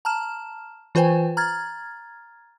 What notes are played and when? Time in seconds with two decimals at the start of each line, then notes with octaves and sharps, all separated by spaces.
0.05 A5 A#5 F6 E7
0.95 E3 F4 B4 C5 G5 G#5
1.37 A#5 F6 G#6 A6